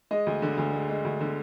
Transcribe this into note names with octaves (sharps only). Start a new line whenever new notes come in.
G#3 D#5
D2
D3
D2
G#3
G#3
D2
D3